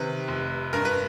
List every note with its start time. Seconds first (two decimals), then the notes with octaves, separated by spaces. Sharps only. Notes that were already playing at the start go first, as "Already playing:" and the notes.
Already playing: C3 D#3 B4
0.28 F1
0.73 G2 A#4
0.85 B4